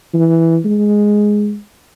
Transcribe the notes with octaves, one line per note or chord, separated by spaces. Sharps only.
E3
G#3